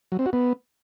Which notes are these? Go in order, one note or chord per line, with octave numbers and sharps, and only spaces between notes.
F#3
C4
F#4
B3